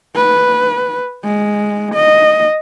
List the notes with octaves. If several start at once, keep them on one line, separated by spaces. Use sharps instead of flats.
B4
G#3
D#5